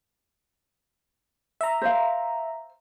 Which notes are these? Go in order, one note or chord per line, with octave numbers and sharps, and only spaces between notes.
E5 A#5
C5 F5